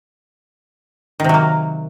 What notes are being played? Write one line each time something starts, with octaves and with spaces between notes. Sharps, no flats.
C3 D#3 F#3 A#3